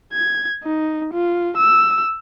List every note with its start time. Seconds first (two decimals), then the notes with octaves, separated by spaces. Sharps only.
0.12 G#6
0.63 D#4
1.13 F4
1.57 E6